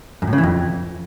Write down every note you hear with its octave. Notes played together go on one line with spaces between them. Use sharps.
F#2
A2
C#3
E3
F2